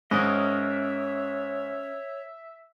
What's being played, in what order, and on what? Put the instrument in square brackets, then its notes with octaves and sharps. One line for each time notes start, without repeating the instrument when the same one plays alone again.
[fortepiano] G#2 [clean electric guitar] C#4 A#4 D#5 [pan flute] C#5 [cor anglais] E5